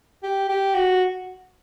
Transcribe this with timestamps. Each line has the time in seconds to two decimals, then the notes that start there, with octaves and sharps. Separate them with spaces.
0.23 G4
0.49 G4
0.74 F#4